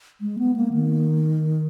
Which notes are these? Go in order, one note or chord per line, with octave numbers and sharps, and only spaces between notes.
G#3
B3
A#3
D#3